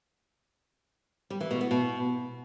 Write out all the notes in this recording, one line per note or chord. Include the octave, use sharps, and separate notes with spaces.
G3
E3
B2
B3
B2